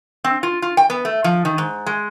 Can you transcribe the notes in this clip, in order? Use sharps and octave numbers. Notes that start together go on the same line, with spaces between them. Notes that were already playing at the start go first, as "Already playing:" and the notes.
C4
F4
F4
G5
B3
A3
F3
D#3
G#2
G#3